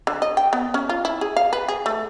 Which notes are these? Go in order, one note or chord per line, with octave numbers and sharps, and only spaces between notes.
D3
D#5
G5
B3
C#4
F4
E4
G#4
F5
B4
G#4
A3